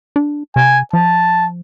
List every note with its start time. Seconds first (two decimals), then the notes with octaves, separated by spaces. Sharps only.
0.16 D4
0.56 C3 G#5
0.93 F3 A5